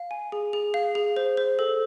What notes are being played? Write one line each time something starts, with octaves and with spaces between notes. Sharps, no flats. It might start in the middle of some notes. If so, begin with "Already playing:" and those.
Already playing: F5
G#5
G#4
G#4
F5
G#4
C5
C5
A4